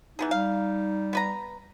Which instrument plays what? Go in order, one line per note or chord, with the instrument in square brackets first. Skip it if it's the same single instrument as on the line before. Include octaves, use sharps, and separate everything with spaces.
[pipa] E3 B3 G#4 [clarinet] D#4
[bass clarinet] G3 [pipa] F5
[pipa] B3 B4 A#5